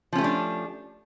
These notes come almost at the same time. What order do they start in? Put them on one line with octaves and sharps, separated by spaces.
F3 C#4 A3 G4 D4